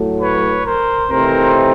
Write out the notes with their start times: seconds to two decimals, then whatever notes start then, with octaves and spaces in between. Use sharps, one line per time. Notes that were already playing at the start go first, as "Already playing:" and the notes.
Already playing: A2 F#3 A3
0.21 B4 C#5
0.65 A#4 C5
1.08 C3 E3 A3 C4 D#4 A#4 C5